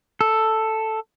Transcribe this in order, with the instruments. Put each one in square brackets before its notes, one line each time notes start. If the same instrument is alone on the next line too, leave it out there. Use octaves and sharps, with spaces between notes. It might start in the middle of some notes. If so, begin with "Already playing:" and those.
[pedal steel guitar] A4